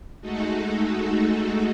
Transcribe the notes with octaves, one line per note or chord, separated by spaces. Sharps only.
G#3 A3 D#4 F#4 A4